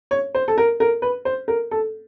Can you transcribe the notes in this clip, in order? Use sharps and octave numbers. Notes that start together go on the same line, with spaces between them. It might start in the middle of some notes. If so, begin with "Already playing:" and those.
C#5
C5
A4
A#4
A#4
B4
C5
A#4
A4